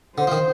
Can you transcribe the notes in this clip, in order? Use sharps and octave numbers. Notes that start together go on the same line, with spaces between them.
D3 C5
F3
D#3